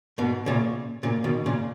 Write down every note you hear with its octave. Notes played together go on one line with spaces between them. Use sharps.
G#2 B2
A#2 C#3
A#2 C#3
B2 D#3
A#2 C#3